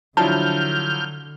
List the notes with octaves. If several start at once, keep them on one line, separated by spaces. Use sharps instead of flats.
D3 F3 F#3 D4 E4 A5 F6 G6